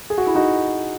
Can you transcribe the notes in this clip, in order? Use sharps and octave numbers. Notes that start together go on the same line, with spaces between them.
G#4
F#4
E4
D#4 F#4